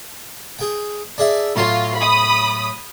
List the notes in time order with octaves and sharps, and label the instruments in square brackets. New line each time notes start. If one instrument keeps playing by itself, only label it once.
[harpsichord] G#4 G5
D4 G#4 E5
[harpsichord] A2 F#3 C6 [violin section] F4
[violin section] B5 D#6